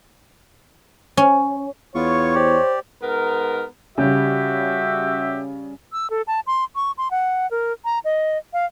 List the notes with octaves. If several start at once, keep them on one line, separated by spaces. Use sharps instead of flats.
C#4
E2 B3 F4 C#5 C#6
G4 C5 D5
G#2 B3 A#4
C#3 G3 F#4 G4 E5
E6
A4
A5
C6
C#6
C6
F#5
A#4
A#5
D#5
F5